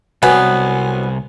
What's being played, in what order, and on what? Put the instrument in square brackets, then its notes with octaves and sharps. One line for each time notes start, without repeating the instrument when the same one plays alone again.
[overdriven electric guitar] C2 [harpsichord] F#3 [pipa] B3 [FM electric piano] G#5